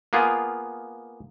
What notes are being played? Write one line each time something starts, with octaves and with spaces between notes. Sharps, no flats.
A#3 B3 F4 G#4